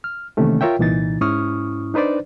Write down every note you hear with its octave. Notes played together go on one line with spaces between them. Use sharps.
F6
C3 D#3 E3 A3 A#3 C#4
F4 A#4 C#5 E5 G5
C2 A#2 E3 D#4 A6
G#2 C#4 E4 C#6 D#6 F6
D4 D#4 B4 C5 D5